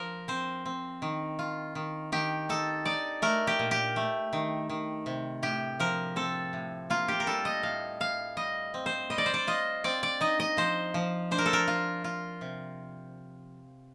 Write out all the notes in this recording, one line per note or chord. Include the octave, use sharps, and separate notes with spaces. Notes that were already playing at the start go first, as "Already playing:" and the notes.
Already playing: F3 A#4
C4 C5
C4
D#3
F4
D#3
D#3 G4
D#4 A4
D#4 D5
A3 A#4
G4
A#2
G4
A3
D#3
D#3
C3
A2 G4
F3 A#4
C4 A4
A2
A#3 F4
G4
A#4
G3 A4
D#5
A2 F5
A2 F5
G3 D#5
C4
C5
G3 D#5
D5
C5
D5
F4 D#5
C4 D5
D5
D#4 D#5
D#5
F3 C5
F3
D4 C5
A#4
A4
A#4
F4
F4
C3